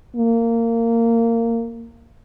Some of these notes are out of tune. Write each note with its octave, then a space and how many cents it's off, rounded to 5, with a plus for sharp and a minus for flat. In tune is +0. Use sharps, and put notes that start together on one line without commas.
A#3 -20